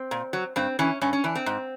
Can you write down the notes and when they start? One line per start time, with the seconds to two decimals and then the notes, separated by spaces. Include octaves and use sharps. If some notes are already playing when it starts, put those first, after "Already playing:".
Already playing: C4
0.11 A#2
0.33 F#3
0.56 G2 C4
0.79 E3 C#4
1.01 G2 C#4
1.13 C#4
1.24 E3 D4
1.35 C4
1.46 G#2